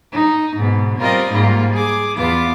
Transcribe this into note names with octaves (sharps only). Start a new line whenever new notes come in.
D#4
G#2 B2
G3 C4 F4 A#4 D5 D#5
G#2 G3 A#3 F4
G#4 D6
E2 B3 F4 D6